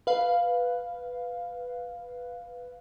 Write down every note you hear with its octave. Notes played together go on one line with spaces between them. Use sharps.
B4 F5